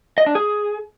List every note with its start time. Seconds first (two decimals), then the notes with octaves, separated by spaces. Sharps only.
0.18 D#5
0.26 D4
0.35 G#4